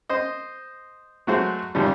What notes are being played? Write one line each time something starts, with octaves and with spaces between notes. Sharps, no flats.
C5 D#5
F#3 G#3 A3 F#4 C5
G#1 F2 G3